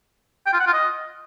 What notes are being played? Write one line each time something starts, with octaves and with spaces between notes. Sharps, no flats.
G5
F4
F#5
F4
D#5